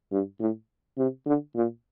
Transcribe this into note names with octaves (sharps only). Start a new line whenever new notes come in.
G2
A2
C3
D3
A#2